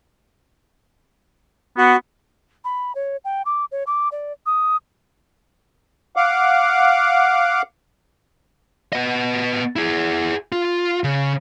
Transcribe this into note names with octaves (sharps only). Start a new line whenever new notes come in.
B3 F#4
B5
C#5
G5
D6
C#5
D6
D5
D#6
F5 F#5 D6
B3 D#5
E4 G#4
F4
C#3